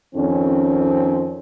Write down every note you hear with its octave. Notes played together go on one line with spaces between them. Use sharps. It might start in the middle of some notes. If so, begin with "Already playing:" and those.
F2 D#3 C4 C#4